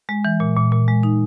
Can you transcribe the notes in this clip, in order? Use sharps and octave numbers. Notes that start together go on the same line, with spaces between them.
G#3
E3
A#2
A#2
A#2
G#3
D#4